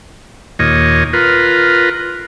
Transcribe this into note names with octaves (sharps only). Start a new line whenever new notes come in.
D#2 A#2 C#5 D#5
F4 A#4 B4